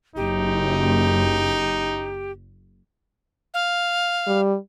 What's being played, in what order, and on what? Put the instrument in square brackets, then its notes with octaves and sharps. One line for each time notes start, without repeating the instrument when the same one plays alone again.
[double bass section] F#1 [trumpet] D#4 [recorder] G4
[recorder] F5
[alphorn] G3